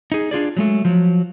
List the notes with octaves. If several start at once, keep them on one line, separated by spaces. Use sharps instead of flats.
D#4 G#4
D4 F4 G#4 D5
F#3 G#3 A3
F3 F#3